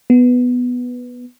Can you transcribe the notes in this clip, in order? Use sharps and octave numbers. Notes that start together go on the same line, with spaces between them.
B3